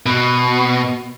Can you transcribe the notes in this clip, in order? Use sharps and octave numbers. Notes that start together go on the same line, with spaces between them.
B2